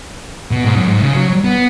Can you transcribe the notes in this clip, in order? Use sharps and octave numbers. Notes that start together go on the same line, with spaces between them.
B2
G#2
F#2
G#2
C#3
F#3
B3